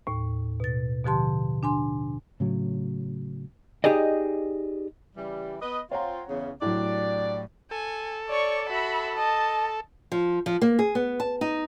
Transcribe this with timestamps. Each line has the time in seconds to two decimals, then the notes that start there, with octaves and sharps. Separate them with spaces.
0.07 D#2 A2
0.60 B2 A6
1.05 B2 D3 F3 G4 A5 C6
1.63 D4 G#5 C6
2.40 A2 C#3 F#3
3.84 D#4 G4 G#4 D5 D#5
5.16 C#3 E3 G3
5.62 B3 B4 D#5
5.92 C4 F4 C#5 F#5 A#5
6.28 E2 C#3
6.62 A2 F#3 D4 G4 D5
7.71 A4 G#5
8.29 C#5 D5 C#6
8.68 F#4 E5 B5
9.17 D#5 A5
10.12 F3
10.46 F3
10.61 A#3
10.79 G#4
10.95 B3
11.20 A5
11.41 D#4